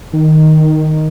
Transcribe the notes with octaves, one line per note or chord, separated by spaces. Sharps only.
D#3